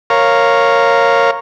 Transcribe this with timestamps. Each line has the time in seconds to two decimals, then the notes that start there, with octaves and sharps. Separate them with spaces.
0.10 A#4 C#5 F5